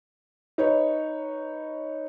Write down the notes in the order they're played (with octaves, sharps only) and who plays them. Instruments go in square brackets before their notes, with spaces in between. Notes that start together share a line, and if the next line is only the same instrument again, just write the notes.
[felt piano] D#4 B4 C#5